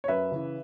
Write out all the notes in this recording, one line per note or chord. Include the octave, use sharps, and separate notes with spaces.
C#5
F#2 B4 E5
C#3 E3